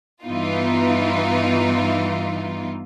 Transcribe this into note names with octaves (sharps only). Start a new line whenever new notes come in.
G2 E3 B3 D#4 F4